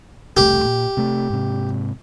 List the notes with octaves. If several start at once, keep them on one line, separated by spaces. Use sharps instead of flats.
E1 C2 A3 G4
A#2
C3 A3
G#2 C3